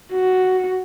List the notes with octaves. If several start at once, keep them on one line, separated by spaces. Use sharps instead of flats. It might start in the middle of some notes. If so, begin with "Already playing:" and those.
F#4